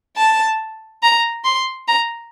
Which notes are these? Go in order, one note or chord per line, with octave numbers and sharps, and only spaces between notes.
A5
A#5
C6
A#5